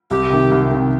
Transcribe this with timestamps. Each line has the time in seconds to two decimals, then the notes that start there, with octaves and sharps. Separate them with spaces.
0.11 C2 G4
0.30 C3 D#3
0.51 C2
0.71 C3 D#3